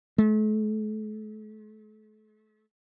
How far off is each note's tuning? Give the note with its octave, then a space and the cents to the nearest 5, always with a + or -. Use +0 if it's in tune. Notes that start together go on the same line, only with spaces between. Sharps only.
A3 -40